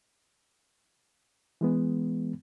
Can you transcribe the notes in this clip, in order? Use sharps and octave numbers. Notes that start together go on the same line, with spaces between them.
E3 G#3 B3